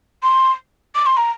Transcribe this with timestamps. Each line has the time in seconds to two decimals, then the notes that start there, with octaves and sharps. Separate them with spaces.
0.23 C6
0.95 D6
1.06 C6
1.17 A#5